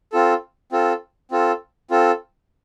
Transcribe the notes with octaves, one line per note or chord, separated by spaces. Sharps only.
C4 F4 A4
C4 F4 A4
C4 F4 A4
C4 F4 A4